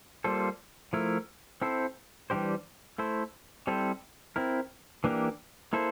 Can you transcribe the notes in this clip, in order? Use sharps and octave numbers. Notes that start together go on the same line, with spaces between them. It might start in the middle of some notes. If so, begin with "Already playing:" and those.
G3 A#3 F4 A4 C5
F3 A3 E4 A#4
C4 E4 A4 C5
E3 G3 D4 G4 C5
A3 E4 A4 C5
G3 C4 E4 A4 C5
C4 E4 A#4
E3 A#3 D4 G4 A#4
A#3 E4 A4 C5